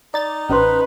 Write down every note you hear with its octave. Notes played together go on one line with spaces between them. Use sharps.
D#4 D5 A6
A1 C#4 B4 C5 C6